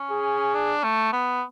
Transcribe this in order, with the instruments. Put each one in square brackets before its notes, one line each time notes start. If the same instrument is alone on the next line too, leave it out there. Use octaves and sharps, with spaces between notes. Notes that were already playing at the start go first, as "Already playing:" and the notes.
Already playing: [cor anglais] C#4
[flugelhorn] G#4
[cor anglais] D4
A3
B3